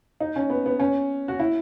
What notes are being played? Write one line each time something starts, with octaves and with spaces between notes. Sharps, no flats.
D#4
C#4
B3
B3
C#4
F#4
E4